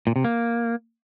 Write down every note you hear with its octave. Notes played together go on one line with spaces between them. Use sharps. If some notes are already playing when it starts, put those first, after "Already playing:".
A#2
C3
A#3